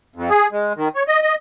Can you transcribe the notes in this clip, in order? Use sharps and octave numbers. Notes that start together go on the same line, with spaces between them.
F2
G#4
G#3
D#3
C#5
D#5
D#5